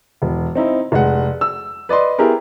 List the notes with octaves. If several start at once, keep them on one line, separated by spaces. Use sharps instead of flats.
E1
C4 D#4 E4
F1 G#3 F#5
E6
B4 D5 D#5 C6
B3 E4 G4 G#4 A#4